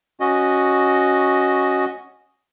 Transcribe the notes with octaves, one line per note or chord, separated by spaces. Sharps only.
C#4 F#4 D#5